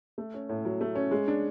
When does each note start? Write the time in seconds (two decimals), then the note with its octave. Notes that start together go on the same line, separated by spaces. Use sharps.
0.18 A3
0.34 C#4
0.49 A2
0.65 F#3
0.81 A3
0.95 C#4
1.11 G#3
1.28 D4